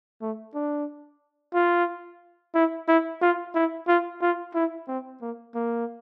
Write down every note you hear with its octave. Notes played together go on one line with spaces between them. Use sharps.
A3
D4
F4
E4
E4
F4
E4
F4
F4
E4
C4
A#3
A#3